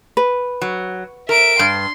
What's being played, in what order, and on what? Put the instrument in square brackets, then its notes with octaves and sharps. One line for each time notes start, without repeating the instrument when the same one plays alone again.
[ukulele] B4
[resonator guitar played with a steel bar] F#3
[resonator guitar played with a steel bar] A#4 [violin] E5 D7
[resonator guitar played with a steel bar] G2 [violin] C6